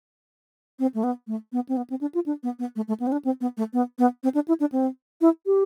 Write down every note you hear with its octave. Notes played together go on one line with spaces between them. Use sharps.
C4
A3
B3
A3
B3
C4
B3
C4
D4
F4
D4
B3
B3
A3
A3
B3
C4
D4
C4
B3
A3
B3
B3
C4
D4
E4
D4
C4
E4
G4